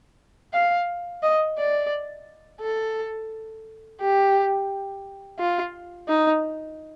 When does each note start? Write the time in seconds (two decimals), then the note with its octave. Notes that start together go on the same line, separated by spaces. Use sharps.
0.53 F5
1.23 D#5
1.58 D5
2.61 A4
4.00 G4
5.39 F4
6.08 D#4